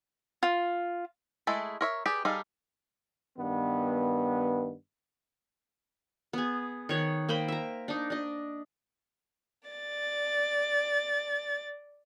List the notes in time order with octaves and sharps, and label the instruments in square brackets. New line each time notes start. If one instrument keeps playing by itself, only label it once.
[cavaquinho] F4
[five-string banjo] G#3 A3 E4 G#4 A4
A#4 C#5 E5
G4 G#4 B4 D5
G3 D#4 G#4 A4 F5
[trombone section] G2 D#3 B3
[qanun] B3 G#4
D#3 C#5 F#5
A#3 C5 G5 B5
E5 A#5
D4 D#4
D4 D#5
[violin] D5 A6